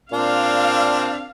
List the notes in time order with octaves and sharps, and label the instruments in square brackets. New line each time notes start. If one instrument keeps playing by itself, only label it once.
[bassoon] A#2 [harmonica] C4 D4 [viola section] F5